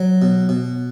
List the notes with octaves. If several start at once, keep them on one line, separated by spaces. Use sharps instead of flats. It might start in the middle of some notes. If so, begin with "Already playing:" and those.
Already playing: F#3
B2
B2